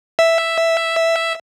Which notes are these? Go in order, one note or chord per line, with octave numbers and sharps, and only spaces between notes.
E5